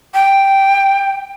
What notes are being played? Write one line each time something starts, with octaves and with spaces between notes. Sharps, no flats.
G5